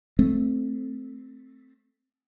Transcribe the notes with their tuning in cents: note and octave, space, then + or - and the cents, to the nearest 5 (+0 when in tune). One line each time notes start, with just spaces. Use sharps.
A3 +0 C4 +0